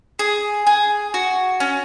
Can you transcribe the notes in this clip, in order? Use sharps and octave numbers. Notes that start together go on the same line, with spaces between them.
G#4
G#4
F#4
C#4